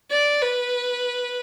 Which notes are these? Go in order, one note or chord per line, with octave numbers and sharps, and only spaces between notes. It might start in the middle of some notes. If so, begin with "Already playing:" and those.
D5
B4